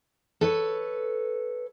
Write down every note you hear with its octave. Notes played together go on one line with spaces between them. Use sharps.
A4 B4 C#5